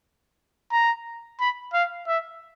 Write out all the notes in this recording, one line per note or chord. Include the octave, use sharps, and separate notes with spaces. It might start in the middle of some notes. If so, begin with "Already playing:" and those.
A#5
B5
F5
E5